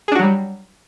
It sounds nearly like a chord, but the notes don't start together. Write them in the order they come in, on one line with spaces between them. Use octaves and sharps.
G#4 D4 F#4 F#3 G3